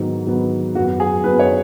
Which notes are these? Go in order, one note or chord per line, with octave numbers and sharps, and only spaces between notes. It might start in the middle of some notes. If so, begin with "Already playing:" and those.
Already playing: G#2 D#3 F#3 B3
G#2 D#3 F#3 B3
F#2 F#3 B3 F#4
G#4
F#2 F#3 B3 B4
C#5